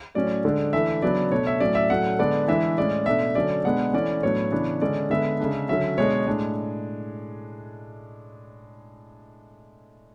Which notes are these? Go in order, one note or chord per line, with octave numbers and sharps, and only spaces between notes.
A2 F#3 C#4 D5
D3 G#3 D4
E3 A3 D4 E5
C#3 F#3 B3 D4 D5
B2 A3 D4 C#5
E5
A2 F#3 C#4 D5
E5
A2 F#3 A3 C#4 F#5
D3 G#3 B3 D4 D5
E3 G#3 D4 E5
A2 G#3 C#4 D5
B2 A3 D4 E5
D3 F#3 A3 C#4 D5
B2 G#3 B3 D4 F#5
E3 A3 C#4 D5
A2 F#3 B3 D4 C#5
C#3 E3 B3 D4
D3 G#3 C#4 D5
D3 G#3 B3 E5
C#3 G#3 D4
D3 F#3 C#4 E5
B2 G#3 D4 C#5
A2 G#3 D4